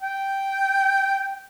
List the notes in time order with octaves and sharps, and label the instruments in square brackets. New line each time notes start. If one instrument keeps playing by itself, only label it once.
[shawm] G5